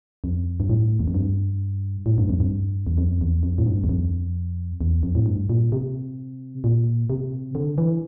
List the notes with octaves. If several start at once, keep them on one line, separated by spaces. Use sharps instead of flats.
F2
G2
A2
E2
F2
G2
A2
G2
F2
G2
E2
F2
E2
F2
A2
G2
E2
F2
E2
F2
A2
G2
A#2
C3
A#2
C3
D3
E3